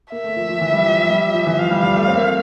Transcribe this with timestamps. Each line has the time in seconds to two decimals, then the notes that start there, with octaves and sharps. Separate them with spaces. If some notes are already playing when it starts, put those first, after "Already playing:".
0.12 A#3 E5
0.24 A3
0.36 F3
0.49 F3
0.61 E3
0.73 G3
0.86 F3
0.98 F3
1.09 G3
1.34 F3
1.46 E3
1.58 F3 F5
1.71 G3
1.83 G3
1.96 A3
2.07 C4
2.16 A#3
2.24 A3